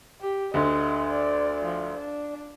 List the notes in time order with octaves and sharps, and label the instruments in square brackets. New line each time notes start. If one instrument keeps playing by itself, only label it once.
[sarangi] G4
[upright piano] D2 D3 [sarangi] D#5
[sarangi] D5
F3
D4